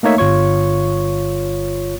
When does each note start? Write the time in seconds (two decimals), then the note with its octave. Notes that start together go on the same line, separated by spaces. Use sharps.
0.03 A3 A#3 D#4 C#5 E5
0.18 G1 F4 C#5 C#6